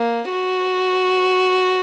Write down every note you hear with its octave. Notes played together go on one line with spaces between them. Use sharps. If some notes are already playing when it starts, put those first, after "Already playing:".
Already playing: A#3
F#4